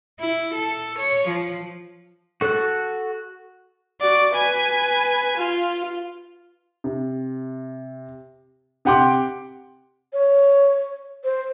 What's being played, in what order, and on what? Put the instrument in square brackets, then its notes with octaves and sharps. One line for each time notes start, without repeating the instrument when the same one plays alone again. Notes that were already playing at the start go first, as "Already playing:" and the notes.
[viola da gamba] E4
A4
C#5
F3
[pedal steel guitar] F#4 A4 F#6
[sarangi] F#4 [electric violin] D5
[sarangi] B4 [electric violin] G#5
[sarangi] F4
[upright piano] C3
C3 G4 F#5 G5 C6 D6
[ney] C#5
C5